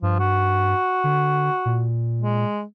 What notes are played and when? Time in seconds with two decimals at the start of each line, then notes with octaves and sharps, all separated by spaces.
0.02 G2 F3
0.20 F#4
1.04 D3
1.66 A#2
2.22 G#3